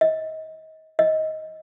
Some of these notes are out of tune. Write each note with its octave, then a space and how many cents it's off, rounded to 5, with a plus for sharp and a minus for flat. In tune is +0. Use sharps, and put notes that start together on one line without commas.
D#5 +30
D#5 +15